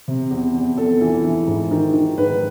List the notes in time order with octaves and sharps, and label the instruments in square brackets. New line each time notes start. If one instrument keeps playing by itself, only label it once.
[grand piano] C3
E2
E2
E2 A4
E3
E3
G#2
D#3
D#3
G#2 B4